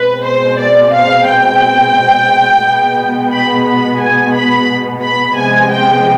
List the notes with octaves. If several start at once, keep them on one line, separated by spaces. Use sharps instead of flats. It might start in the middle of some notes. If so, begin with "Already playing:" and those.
Already playing: B2 G#3 C4 B4
C5
D5
F5
G5
B2 G#3 B3
B5
B5
G#5
B5
B5
C3 F3 G#3 B3 G#5
G5